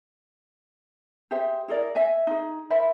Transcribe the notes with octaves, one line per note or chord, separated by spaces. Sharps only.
G4 G#4 C5 E5
E4 G#4 A#4 D5
D#5 E5 G#5
D#4 G#4
A#4 C5 E5 B5